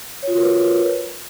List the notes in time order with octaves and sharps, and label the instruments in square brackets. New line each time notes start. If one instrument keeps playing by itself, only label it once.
[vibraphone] C#5
F4
F#4
A#4
B4